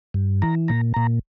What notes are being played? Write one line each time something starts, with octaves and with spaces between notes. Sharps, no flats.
G2
E3 A#5
A#2 A#5
A#2 A#5